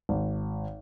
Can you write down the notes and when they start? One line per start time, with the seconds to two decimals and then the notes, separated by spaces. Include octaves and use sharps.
0.09 G#1